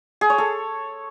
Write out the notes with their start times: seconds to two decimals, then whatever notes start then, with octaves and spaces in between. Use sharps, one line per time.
0.21 G#4
0.30 C#5
0.38 A4